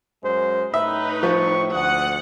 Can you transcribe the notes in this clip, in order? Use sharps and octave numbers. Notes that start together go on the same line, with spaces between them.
F#2 G#3 C5
A2 D#4 B4 E5 B5
F3 C#6
D2 F#5 D#6